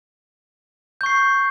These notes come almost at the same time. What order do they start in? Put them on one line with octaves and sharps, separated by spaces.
G6 C#6 C7